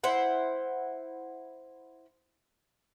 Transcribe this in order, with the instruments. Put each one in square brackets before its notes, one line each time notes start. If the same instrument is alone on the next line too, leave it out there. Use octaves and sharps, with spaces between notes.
[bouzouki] E4 C5 F#5